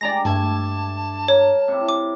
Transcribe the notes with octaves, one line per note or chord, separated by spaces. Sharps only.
G#3 D4 G4 D5 A#5 A#6
G2 A3 A5 G#6
A#4 C#5
C3 E4
D6